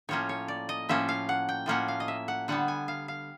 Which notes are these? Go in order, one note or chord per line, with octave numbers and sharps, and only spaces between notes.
A2 F3 A#3 C#4 C#5
C#5
D5
D#5
A2 F3 A#3 C#4 E5
F5
F#5
G5
A2 F3 A#3 C#4 F#5
F5
D#5
E5
F#5
D3 G3 B3 F#5
G#5
F5
F5